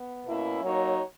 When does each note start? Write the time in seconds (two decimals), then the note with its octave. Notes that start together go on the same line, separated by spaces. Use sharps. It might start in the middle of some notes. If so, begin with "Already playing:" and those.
Already playing: B3
0.25 B2 A#3 C#4 E4
0.62 F#3 A#3 D#4 F#4 C#5